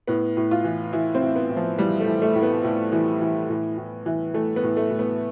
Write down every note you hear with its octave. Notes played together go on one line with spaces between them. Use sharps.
A2 B3
A2
F4
E3
E3 E4
C4
A2
B3
A2
F3
E3 G3
A3
E3
A3
A2
B3
A2
E3
E3
A2
A2
E3
E3 A3
B3
A2
A3
A2
B3